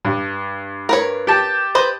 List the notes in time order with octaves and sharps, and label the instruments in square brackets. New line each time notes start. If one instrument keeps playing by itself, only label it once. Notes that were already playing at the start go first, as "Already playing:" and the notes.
[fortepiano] G2
[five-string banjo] A#4 B4 C#5
[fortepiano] G4 A5
[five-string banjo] B4 C5 D#5